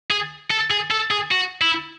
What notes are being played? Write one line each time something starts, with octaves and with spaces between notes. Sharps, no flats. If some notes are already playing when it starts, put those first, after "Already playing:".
G#4
A4
G#4
A4
G#4
F#4
E4